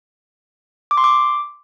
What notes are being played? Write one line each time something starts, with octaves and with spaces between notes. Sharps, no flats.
D6
C6
D6